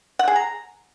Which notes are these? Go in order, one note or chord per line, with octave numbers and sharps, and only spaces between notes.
F#5
G#4
A#5